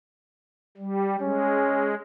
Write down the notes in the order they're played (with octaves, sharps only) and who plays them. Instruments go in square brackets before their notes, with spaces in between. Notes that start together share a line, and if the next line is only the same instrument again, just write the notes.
[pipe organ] G3
[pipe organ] G#3 [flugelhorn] C#4